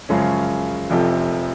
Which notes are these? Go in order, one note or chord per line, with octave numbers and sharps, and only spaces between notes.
F#2 C#3 F3 G#3 C#4
F1 F2 C3 F3